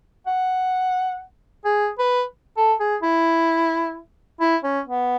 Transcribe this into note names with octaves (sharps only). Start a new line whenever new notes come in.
F#5
G#4
B4
A4
G#4
E4
E4
C#4
B3